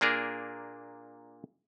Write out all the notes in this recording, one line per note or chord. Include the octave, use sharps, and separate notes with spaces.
A#2 A#3 D4 G#4 A#4